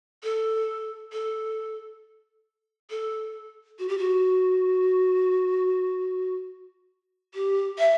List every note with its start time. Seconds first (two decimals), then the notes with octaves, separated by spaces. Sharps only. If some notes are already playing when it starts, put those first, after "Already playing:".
0.24 A4
1.13 A4
2.90 A4
3.79 F#4
3.88 G4
3.98 F#4
7.34 G4
7.79 E5